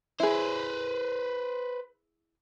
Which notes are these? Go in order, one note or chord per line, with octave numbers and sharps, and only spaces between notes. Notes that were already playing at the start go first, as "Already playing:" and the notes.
E4 G#4 B4 C5